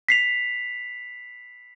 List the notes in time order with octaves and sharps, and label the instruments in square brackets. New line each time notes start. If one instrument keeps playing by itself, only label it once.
[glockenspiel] B6 C7 F7